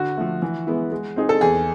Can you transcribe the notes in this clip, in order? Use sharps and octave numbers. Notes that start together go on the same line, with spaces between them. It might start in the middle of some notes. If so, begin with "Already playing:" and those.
Already playing: D3 F#4
F3 A3
E3
G#3 B3 E4
G#3
C4 D#4 G#4
A4
E2 G#4